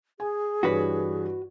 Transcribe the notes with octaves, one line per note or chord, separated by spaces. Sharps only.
G#4 G#5
G2 E3 F#4 B4 C#5